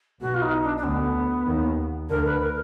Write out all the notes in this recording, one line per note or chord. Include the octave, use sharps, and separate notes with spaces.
B1 B2 F#4
F4
D#4
D4
D4
D2 D3 B3
D#2 D#3
D2 D3 A#4
B4
A#4